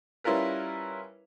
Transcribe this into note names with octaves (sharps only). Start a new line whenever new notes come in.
G3 C#4 E4 F4 A#4 B4